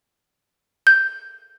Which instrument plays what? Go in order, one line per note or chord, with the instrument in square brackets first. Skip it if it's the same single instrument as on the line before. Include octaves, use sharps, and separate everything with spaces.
[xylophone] G6